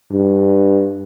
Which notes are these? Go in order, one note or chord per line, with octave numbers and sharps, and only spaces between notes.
G2